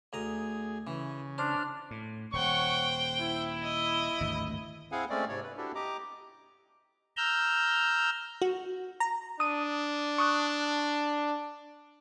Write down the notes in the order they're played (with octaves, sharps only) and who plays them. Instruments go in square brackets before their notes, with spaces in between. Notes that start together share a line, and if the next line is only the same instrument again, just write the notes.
[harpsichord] D2 A#5 D#6 [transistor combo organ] G#4
[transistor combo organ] C#3 [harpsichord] E3
[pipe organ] D4 F6 [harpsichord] C5
[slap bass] A2
[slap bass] D#1 [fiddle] C5 G5 [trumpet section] C#5 F#5 C#6
[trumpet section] E4
[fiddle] D#5
[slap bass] G#1 D2 G2
[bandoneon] C4 E4 G#4 F5 F#5 G#5
G#3 A3 C4 C#4 D5
G#2 C3 C#5 D5
B4
D4 E4 F#4 G4 A4
G4 D#5 A#5 D6
[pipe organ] A#5 E6 F6 G6
[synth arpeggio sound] F#4
A#5
[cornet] D4 [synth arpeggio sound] D#6 D#7
[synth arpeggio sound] C#6 D#6 F#6